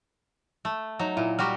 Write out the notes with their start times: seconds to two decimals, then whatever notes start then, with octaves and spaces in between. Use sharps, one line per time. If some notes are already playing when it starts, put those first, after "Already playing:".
0.65 A3
0.99 F#3 D#4
1.17 A#2 E4
1.39 G3 F#4 G4 A#5 C#6 F6